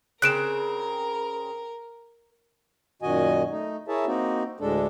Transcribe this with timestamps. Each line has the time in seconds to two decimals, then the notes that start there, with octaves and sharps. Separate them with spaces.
0.22 C#3 C4 A#4 F#6 D7 E7
3.02 F#2 A#2 D#3 F#4 D#5 G#5
3.51 A3 D#4
3.88 E4 G#4 A#4 C#5 E5 A5
4.06 A#3 C4 D#4 F#4
4.60 D2 A2 G#3 D4 A4